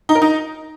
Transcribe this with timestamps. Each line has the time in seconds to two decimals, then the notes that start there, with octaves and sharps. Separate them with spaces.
0.09 D#4
0.15 A#4
0.22 D#4